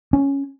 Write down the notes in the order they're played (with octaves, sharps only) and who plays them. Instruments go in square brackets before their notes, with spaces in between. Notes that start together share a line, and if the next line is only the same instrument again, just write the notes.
[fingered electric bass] C#4